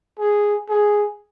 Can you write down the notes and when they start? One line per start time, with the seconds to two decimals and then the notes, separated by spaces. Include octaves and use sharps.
0.19 G#4
0.69 G#4